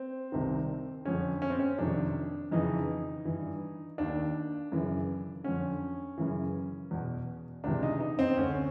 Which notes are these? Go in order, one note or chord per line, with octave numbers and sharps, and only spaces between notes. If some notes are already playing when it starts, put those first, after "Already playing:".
Already playing: C4
C2 C3 D#3
F2 D3 C#4
C#4
C4
C#4
F2 C3 D#3 D4
F2 C#3 E3 D#4
G2 E3
D#2 D#3 D4
F#2 C#3 E3
F2 D3 C#4
F#2 C#3 E3
E2 B2
C#2 C3 E3 D4
D#4
D#4
C4
D2 D3 C#4